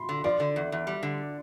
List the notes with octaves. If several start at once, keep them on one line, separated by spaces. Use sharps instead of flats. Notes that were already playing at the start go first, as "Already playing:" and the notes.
Already playing: B5 C6
D3
F3 D5
D3
E2
E2
G3
D3